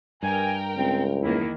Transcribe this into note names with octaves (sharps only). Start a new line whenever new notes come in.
G2 A#4 G5 G#5
C#2 C4
E2 D#3 A#3 E4